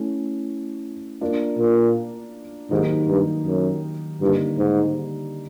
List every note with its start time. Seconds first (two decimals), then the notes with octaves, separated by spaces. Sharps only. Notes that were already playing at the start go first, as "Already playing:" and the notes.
Already playing: A3 C#4 E4
1.21 A#3 D4 F4 A#4
1.59 A#2
2.71 G#2 D#3 F#3 A#3 D#4 G4
3.08 G2
3.46 F#2
4.21 G2 D3 G3 A#3 D#4
4.58 G#2